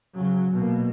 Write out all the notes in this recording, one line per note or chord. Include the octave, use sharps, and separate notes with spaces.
C#3 F#3
B2 A#3